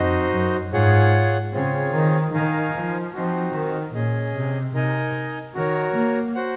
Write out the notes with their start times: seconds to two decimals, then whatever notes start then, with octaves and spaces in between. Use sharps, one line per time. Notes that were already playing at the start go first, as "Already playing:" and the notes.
Already playing: F2 D#4 F#4 C5 D#5
0.32 F#2
0.72 G#2 F4 G#4 C#5 F#5
1.53 C#3 C4 F4 G#4 C#5
1.93 D#3
2.33 D#3 D#4 A#4 F5 G#5
2.74 F3
3.14 F3 C4 D#4 F#4
3.53 D#3
3.93 A#2 C#4 G#4 D#5
4.34 C3
4.74 C3 D#4 A#4 D#5 G#5
5.54 D#3 F#4 A#4 C#5
5.95 A#3
6.35 F#4 C5 F#5